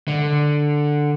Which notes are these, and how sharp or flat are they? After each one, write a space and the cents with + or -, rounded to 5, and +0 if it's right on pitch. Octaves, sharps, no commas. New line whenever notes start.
D3 +5